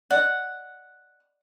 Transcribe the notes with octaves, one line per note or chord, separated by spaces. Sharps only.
D5 D#5 F#5